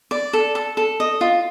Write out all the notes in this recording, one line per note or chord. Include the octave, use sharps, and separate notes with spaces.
D5
A4
A4
A4
D#5
F4